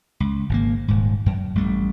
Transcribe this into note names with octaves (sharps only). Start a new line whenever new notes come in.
C#2
G#1 C3 A#3
D#1 G#2
F#2
A1 G3 A3